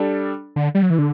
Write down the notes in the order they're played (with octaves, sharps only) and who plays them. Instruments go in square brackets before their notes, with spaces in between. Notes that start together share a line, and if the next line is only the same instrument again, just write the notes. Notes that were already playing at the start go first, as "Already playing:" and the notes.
Already playing: [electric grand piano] G3 D4 A4
[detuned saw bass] D3
G3
F#3
E3
D3